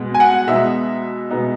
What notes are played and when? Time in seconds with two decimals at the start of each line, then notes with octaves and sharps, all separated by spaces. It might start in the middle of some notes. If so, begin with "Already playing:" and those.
Already playing: B2 G#3 B3
0.14 G#5
0.20 F#5
0.47 B2 G#3 B3 D#4 E5
1.31 B2 G#3 B3 D#4